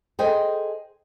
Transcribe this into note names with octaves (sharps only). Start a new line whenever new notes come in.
G#4 A4 C5 D#5 G5